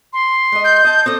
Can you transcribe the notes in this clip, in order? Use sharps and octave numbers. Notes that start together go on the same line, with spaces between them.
C6
G#3 D#5
G6
D#5 A5
C4 A4 D5 D#6